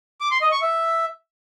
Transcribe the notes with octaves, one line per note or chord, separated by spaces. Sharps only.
D6
C6
D#5
C#6
E5